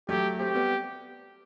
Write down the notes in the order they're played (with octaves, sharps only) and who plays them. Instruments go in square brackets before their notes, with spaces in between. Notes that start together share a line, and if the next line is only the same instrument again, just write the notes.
[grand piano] F#3 A3 [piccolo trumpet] G4
[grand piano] A3 C4 [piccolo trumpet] G4
[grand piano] G3 B3